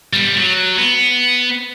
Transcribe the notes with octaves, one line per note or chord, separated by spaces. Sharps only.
G3 B3
F#3
B3